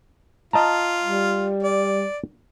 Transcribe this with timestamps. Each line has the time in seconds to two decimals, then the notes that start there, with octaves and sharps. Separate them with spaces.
0.53 F4 D#5 A5 A#5
1.03 G3
1.63 D5